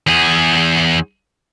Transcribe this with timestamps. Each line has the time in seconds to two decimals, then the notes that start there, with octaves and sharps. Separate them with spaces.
0.07 E2 G#4